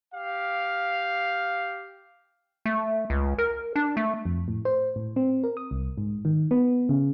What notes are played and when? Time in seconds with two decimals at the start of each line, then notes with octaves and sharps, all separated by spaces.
0.14 G4 F5
2.66 A3
3.10 C#2
3.38 A#4
3.76 D4
3.97 A3
4.25 F2
4.48 A2
4.65 C5
4.96 A2
5.16 C4
5.44 A#4
5.57 D#6
5.71 C2
5.98 G#2
6.25 D#3
6.51 B3
6.89 C#3